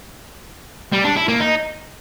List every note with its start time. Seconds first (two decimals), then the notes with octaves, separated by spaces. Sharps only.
0.93 G3
1.05 D4
1.16 E4
1.28 A#3
1.40 D#4